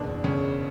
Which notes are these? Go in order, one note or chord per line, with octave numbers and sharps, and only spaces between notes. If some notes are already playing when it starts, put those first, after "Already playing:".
Already playing: F#1 E2 B2 D4
C#3 C#4